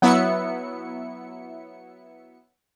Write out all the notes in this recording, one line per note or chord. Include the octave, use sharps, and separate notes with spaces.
F#3 B3 E4 E5 C#7